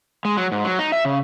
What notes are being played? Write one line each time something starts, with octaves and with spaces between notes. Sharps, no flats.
G#3
F#3
G#2
F#3
D#4
E5
C#3